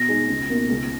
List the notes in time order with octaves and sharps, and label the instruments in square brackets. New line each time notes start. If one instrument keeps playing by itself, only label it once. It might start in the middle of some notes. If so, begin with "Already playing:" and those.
Already playing: [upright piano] B2 [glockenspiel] A#6
[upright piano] G#3 D#4 G#4
C#2
B2 A#3
C#2